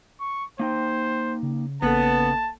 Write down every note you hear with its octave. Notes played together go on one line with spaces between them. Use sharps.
C#6
A#3 D#4 C5 G5
C#3
A1 C#3 A#3 B3 A4 A5